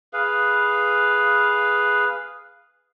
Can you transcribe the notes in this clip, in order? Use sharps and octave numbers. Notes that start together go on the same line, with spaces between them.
G#4 B4 F5